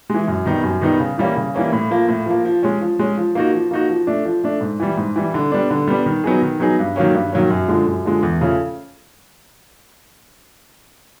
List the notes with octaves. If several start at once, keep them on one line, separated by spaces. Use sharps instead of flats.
E3 G#3
F#2
D#3 G3 B3 D#4
F#2
D#3 G3 B3 D#4
C#3
E3 G3 A#3 C#4
C#3
E3 G3 A#3 C#4
A2
F3 A#3
A2
F3 A#3
F3
G#3 C#4
F3
G#3 C#4
F3
A#3 D#4 F#4
F3
A#3 D#4 F#4
F3
A3 D4
F3
A3 D4
G#2
E3 G3
G#2
E3 G3
D3
G3 B3 D4
D3
G3 B3 D4
D#3
F#3 B3 D#4 G#4
D#3
F#3 B3 D#4 G#4
G2
D#3 F#3 A#3 C#4
G2
D#3 F#3 A#3 C#4
F#2
D3 F3 G#3
F#2
D3 F3 G#3
E2
C#3 F3 A3 C#4